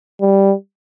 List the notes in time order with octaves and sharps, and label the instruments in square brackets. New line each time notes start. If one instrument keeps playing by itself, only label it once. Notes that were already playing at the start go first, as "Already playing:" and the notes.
[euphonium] G3